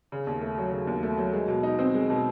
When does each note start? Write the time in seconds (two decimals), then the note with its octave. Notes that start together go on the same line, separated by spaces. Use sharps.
0.12 C#3
0.27 D#2
0.41 A3
0.58 F#3
0.72 C#3
0.87 D#2
1.03 A3
1.18 F#3
1.33 G#3
1.48 B2
1.63 D#4
1.79 C4
1.94 G#3
2.10 B2